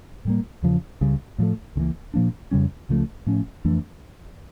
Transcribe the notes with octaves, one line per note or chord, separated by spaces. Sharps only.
A2 G3 A#3
E2 C#3 F3
C#2 C#3 G3 C#4
A2 F3 A3
C#2 C#3 E3 A#3
A#2 F3 A#3 D4
F2 C#3 G3 C#4
C#2 C#3 F3 A3
A2 F3 C#4
F2 E3 A3 D4